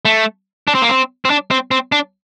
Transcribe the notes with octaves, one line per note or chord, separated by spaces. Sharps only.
A3
D4
C4
A#3
C4
C4
D4
C4
C4
D4